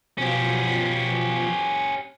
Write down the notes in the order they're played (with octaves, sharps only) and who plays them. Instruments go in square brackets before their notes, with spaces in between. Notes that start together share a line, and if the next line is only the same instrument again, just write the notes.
[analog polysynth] B2 F3 [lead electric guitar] C#4 G4